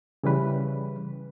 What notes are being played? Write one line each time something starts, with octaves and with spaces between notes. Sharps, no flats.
C#3 E3 G3 B4